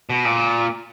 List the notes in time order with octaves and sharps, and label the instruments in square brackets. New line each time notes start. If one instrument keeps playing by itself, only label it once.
[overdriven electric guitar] B2
A#2